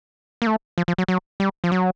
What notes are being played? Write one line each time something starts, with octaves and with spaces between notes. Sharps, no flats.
A#3
A3
F3
F3
F#3
F#3
G3
F3
F#3